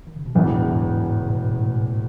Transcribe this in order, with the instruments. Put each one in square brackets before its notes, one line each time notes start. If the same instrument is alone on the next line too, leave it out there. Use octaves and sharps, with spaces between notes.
[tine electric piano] D#3
C#3
B2
[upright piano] E1 E2 C#3 E3 B3 [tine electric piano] A2
[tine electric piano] G#2
G#2
B2
A2
C#3
B2
A2
B2
B2